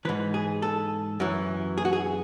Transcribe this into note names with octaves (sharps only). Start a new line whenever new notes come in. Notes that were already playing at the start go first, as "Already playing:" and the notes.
G#2 E3 B4
G#4
A4
F#2 E3
G#4
F#4
G#4